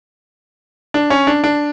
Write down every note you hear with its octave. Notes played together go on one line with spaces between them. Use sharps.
D4
C#4
D4
D4